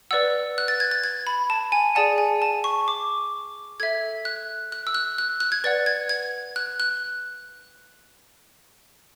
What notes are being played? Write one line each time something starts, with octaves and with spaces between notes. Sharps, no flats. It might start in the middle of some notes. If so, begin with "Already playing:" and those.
B4 D5 F#5 E6
F#6
A6
G#6
A6
G#6
B5
A5
G#5
G#4 D5 F#5 A5
G#5
A5
C#6
D6
A4 E5 G#6
F#6
F#6
E6
F#6
F#6
F#6
G#6
B4 D5 F#5 A6
G#6
G#6
F#6
F#6